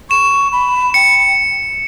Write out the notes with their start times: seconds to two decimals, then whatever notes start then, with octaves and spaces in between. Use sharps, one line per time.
0.10 C#6 E7
0.52 B5
0.94 G5 C#7